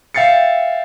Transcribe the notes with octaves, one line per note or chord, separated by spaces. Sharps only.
E5 F5 G5 A6 C7 C#7